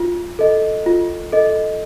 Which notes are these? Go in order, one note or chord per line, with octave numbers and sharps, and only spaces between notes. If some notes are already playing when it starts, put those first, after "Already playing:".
Already playing: F4
A4 D#5
F4
A4 D#5